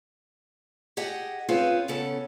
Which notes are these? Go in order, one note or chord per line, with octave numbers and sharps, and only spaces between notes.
G4 G#4 D#5 F#5
C4 C#4 F4 G#4 B4
C#3 B3 C#4 A4